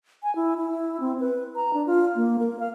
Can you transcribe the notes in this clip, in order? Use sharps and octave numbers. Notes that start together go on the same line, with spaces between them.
G#5
E4
E4
C4
B4
A#5
D4
F4
A#3
A#4
F5